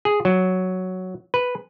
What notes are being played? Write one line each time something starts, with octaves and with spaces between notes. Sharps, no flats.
G#4
F#3
B4